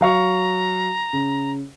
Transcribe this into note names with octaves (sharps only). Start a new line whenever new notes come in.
F#3 F5 A#5 C#6
C#3